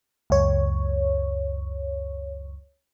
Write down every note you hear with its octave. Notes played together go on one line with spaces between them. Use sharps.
C#2 F#2 C#5